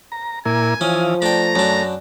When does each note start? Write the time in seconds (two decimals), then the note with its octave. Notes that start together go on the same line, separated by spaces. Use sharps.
0.12 A#5
0.45 A#2 A#3 E4 G#5
0.81 E3 F3 C#4 F5 D#6
1.22 A3 D4 G5 A#5
1.55 F#2 D4